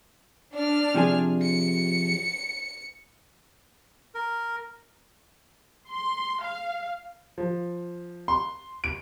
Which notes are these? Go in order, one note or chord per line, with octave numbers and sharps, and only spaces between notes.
D4 F6
C3 F3 G#4
C#7
A#4
C6
F5
F3
C6
D7